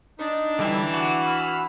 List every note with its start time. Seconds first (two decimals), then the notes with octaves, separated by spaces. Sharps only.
0.19 D4 D#4
0.59 D3 E3 G3 E5
0.94 F#4 D6
1.27 B5 E6 F6